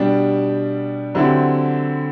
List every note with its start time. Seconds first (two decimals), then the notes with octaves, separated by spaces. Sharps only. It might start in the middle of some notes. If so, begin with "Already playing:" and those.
Already playing: B2 G3 D4 G4
1.15 D3 F#3 C4 E4 G4